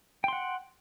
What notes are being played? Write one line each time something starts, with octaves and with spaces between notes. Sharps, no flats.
F#5 G5 C6